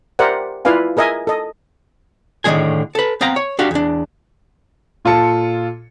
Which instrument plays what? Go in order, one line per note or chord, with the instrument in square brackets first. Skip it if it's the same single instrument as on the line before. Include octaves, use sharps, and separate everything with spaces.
[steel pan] G4 A#4 C5 D5 E5 F#5
E4 F4 B4 D5 F5 G#5
G#4 A#4 D#5 E5 G#5
A4 D#5
[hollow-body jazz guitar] A2 D3 D#3 A3 G#4 G#5
A4 B4
B3 C4 F5 G5 A#5
C#5
D4 F#4 G4 F5
E2 D4
[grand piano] A#2 F4 A4 A5 C#7